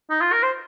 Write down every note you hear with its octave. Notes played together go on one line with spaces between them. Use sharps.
D#4
F4
A#4
C5